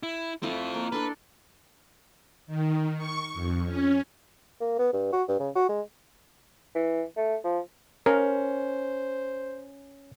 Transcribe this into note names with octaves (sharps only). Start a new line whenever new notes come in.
E4
A3 C4 E4 F4
A#3
D4 A4 B4 C6
D#3
C#6
F2
C#4
A#3
B3
G2
F#4
G2
C#3
F#4
G#3
E3
A3
F3
C#4 A#4 C5